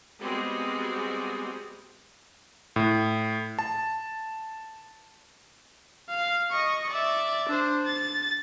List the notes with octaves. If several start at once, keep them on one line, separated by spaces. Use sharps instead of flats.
G3 G#3 B3 C4 F#4 G#4
A2
A5
F5
D#5 C#6
D5 E5
D4 C5
A6